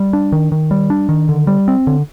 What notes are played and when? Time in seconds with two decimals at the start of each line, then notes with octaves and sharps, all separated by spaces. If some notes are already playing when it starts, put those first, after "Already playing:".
Already playing: G3
0.13 D4
0.32 D#3
0.52 D#3
0.71 G3
0.90 D4
1.09 D#3
1.29 D3
1.47 G3
1.68 C4
1.87 D3